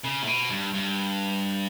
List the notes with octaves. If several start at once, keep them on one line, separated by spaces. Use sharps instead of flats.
C#3
A2
B2
G2
G2